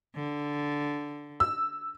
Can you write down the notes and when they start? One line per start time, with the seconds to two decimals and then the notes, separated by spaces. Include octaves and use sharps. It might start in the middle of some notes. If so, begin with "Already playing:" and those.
0.15 D3
1.40 E6